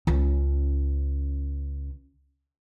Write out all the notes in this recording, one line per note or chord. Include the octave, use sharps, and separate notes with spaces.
C#2 C#4